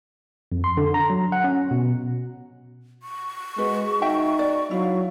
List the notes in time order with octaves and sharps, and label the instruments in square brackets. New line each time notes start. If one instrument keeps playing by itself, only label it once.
[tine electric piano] F2
C6
D3
A#5
F#3
F#5
C#4
B2
[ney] C#6
[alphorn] G#3 [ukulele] F#4 B4
[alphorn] D#4 [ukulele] F#4 E5 G5
[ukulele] D5
[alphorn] F#3 [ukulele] E4 [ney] F5